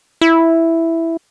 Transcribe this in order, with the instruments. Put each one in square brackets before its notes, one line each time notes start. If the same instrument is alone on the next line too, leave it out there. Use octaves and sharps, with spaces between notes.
[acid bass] E4